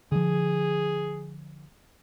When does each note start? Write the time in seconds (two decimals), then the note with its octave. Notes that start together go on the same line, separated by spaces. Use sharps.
0.12 D3 F3 G#4